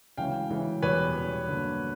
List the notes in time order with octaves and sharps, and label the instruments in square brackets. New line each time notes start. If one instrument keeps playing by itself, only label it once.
[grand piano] D2 C#3 E3 G#3 C#4 F5 G5
D2 C#3 E3 G#3 C#4
E2 B2 G3 B4 C#5
E2 B2 G3
G2 D3 F#3 A#3